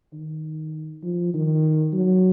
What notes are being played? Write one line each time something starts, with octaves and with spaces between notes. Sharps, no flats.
D#3
F3
D#3
F#3